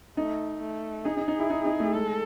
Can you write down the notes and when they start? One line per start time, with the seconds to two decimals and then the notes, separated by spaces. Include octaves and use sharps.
0.17 A3 D#4
0.61 A3
1.05 D#4 G#4
1.17 D#4
1.28 D#4
1.39 E4
1.50 D#4
1.65 D#4
1.80 A3
1.94 G#3 A4